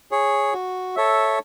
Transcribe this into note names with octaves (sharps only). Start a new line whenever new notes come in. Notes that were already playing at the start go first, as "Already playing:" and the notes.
G#4 C#5
F#4
A4 C#5 E5